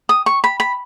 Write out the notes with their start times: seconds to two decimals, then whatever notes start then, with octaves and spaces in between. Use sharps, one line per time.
0.09 D#6
0.26 C#6
0.44 B5
0.60 B5